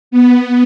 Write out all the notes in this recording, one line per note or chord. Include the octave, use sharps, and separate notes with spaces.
B3